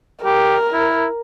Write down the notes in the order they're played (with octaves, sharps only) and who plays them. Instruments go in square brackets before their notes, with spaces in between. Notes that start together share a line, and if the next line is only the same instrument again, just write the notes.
[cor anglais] G4 [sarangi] A#4
[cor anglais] E4